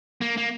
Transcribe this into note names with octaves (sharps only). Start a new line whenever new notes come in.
A#3
A#3